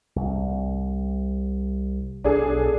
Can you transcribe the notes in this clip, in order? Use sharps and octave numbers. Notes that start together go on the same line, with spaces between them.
C2
B1 D4 G#4 A4